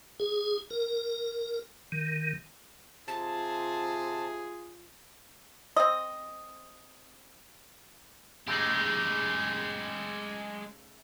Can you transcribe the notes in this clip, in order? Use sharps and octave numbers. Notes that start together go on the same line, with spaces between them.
G#4
A#4
D#3
C3 F4 G#4 A5
C4 D#5
C#3 G#3 A3 D#4 G4